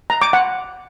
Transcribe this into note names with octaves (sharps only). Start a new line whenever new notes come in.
A#5
D6
F#5